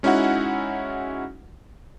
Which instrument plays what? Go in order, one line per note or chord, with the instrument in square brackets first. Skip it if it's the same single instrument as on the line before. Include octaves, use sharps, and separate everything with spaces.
[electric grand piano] G#3 C#4 D#4 E4 F#4 F#5